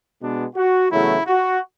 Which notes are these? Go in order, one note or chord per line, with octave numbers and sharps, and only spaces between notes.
B2 G#3 B3 D4
F#4
E2 C#3 F#3 A3 C#4 E4
F#4